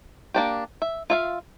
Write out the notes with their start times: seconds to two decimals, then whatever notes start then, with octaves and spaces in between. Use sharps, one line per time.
0.34 A#3 D4 G4
0.82 E5
1.10 F4 E5 F5